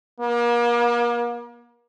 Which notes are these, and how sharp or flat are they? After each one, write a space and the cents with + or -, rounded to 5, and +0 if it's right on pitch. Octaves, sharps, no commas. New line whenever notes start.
A#3 +40